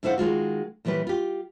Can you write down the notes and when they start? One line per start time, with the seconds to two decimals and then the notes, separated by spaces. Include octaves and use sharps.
0.03 G#2 D3 E4 C5 F5 F#5
0.18 D#3 G#3 F4 F#4
0.85 A#2 E3 G3 C#4 B4
1.07 F4 G4